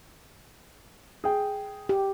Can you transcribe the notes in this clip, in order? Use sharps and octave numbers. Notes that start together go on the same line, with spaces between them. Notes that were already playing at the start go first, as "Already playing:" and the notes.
G#4 G5
G4